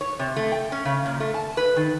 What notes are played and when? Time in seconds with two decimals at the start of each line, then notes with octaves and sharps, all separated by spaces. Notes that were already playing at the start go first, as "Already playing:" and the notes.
0.01 C#5
0.19 C3
0.36 A3
0.52 G5
0.72 C#4
0.85 C#3
1.06 A#2
1.20 A3
1.34 A5
1.57 B4
1.76 D#3